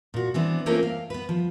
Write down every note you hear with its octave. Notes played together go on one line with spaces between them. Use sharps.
A#2 F#4
E3 B3 C4 D4
A3 A#3 C4 C#4 F4 A#4
F5
B3 B4
F3